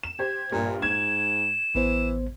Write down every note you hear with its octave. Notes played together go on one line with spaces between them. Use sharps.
E7
G4 C5 G#6
A#1 G2 A#2
G#2 G#6 E7
A1 E3 B3 C5